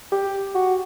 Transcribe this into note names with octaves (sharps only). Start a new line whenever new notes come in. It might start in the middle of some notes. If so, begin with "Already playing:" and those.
G4
F#4